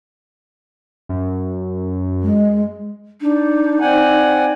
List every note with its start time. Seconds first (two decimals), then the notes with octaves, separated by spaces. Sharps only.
1.09 F#2
2.22 G#3
3.21 D4 D#4
3.81 C4 D5 F#5 G#5